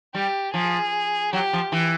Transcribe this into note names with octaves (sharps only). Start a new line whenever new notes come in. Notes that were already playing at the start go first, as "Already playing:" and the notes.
G3 G4
F3 G#4
F#3 G4
F3
E3